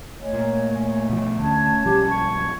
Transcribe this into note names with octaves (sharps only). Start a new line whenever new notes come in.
A3 C#5 D#5 G#5
A#2
B2 F3
D2 C#4 A5 G#6
B1 F3 G3 G4
C#6